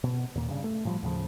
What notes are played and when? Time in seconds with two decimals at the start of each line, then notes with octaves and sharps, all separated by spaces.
0.04 B2
0.35 D#2 A#2
0.49 G2 C#3
0.64 A3
0.85 A2 F3 G3
1.02 D#2 A2 C#3 F3